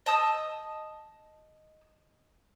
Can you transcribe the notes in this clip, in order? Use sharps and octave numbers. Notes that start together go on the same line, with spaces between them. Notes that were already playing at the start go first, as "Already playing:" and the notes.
D#5 A5 D#6 E6